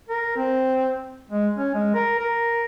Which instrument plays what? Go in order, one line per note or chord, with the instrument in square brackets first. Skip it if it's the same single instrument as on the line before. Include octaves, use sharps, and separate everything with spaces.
[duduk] A#4
C4
G#3
C#4
G#3
A#4
A#4